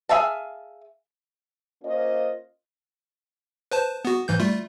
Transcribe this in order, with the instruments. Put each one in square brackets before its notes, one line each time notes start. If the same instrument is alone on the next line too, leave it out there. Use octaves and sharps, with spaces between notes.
[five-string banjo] G#4 B4 E5 F5 A5
[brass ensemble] A#3 C#4 F4 C5 D#5
[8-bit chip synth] B4 C5 A5
B3 F#4
G#2 E3 G6
G3 A3 F4